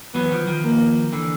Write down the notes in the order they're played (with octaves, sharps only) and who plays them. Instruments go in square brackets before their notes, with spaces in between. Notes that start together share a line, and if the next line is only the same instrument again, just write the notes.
[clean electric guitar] E3 F#3 [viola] B3
[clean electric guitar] D#3 F3
D#3 F3
[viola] A#3
[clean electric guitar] D3 E3